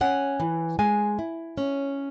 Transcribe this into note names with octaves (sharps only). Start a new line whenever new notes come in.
C#4 F#5
E3
G#3 G#5
E4
C#4